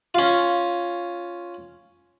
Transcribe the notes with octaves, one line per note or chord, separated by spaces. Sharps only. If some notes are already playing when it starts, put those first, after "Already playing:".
C#4 F4